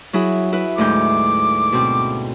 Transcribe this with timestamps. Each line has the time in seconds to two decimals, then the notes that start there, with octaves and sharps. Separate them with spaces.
0.13 F#3 E4 G#4
0.52 E4 B4
0.78 D2 G#2 D6 G6
1.72 B2 C4